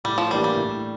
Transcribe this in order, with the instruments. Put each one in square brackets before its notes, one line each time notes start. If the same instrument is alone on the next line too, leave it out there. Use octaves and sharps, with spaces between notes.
[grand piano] A2 [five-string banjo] G3
[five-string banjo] F3
[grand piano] E3 A#3 D4 G4 [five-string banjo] G3
[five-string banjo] G3
[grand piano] A2